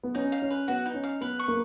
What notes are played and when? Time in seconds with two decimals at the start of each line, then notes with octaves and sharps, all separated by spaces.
0.03 B3
0.15 C#4 D#4
0.32 F5
0.42 C#4
0.50 B4
0.68 B3 F#4
0.86 D#4
0.94 C#4
1.03 F5
1.21 B3 B4
1.39 C#6
1.48 A#3